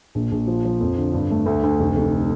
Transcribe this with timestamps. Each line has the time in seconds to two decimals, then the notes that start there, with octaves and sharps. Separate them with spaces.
0.15 A#1
0.32 A#1
0.47 F3
0.64 F3
0.81 F2
0.97 D3
1.13 G2
1.30 A3
1.46 D2
1.63 D2
1.79 F1
1.96 F1